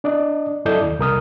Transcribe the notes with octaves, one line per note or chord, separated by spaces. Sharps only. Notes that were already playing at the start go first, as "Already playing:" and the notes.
D4 D5 D#5
F#2 E4 A4 D5 D#5 G6
D#2
C2 A#4 D#6 F6